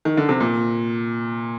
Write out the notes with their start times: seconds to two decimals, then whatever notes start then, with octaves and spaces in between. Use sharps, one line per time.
0.05 D#3
0.17 D3
0.29 C3
0.40 A#2